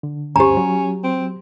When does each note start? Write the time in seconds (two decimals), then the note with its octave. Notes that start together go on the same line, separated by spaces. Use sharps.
0.03 D3
0.36 D2 G2 C#4 G4 C5 A#5
0.57 F#3
1.04 C4